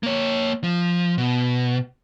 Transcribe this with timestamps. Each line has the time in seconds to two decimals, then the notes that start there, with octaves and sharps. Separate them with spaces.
0.03 A#3 C#5
0.64 F3
1.18 B2